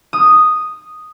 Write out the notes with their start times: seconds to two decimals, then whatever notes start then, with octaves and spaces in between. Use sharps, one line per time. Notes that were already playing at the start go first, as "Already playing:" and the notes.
0.13 D#6